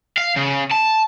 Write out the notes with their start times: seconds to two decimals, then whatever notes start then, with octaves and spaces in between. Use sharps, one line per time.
0.18 F5
0.37 C#3
0.71 A5